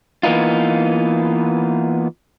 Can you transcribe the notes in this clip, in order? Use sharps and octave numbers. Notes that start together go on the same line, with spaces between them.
E3 A#3 B3 D#4 F4